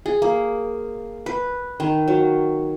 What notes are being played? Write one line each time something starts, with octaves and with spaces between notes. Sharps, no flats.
G#4
A#3
B4
D#3
F#3